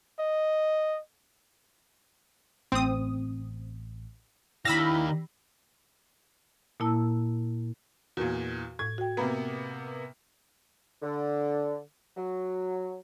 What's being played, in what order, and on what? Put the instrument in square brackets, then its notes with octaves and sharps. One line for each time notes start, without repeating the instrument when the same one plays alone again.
[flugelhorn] D#5
[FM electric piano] A1 [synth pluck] C4 D#6
[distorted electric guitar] D#3 F5 [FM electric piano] D4 G4 [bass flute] E4 [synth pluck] B5 E6 A#6
[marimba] A#2 A#3 E4 A5 E6
[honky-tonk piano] E2 A#2 [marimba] F#4 A#4
[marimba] A2 [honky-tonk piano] G#6
[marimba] F#4 G5
[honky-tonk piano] C3 A#3 B3 [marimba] A#4 A#5 B5
[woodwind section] D3
F#3